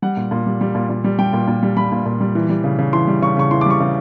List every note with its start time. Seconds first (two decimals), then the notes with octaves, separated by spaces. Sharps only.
0.02 G3 F#5
0.17 A#2
0.31 A#2
0.46 G3
0.61 G3
0.75 A#2
0.89 A#2
1.04 G3
1.19 G3 G5
1.33 A#2
1.47 A#2
1.63 G3
1.77 G3 B5
1.92 A#2
2.06 A#2
2.21 G3
2.35 E3
2.49 G3
2.64 C#3
2.79 C#3
2.93 E3 C6
3.07 G3
3.22 C#3 C#6
3.37 C#3 C#6
3.51 E3 C6
3.61 D6
3.66 G3 C#6
3.80 C#3